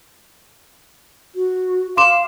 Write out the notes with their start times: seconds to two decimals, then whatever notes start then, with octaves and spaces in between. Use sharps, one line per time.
1.35 F#4
1.97 F5 C6 D6 E7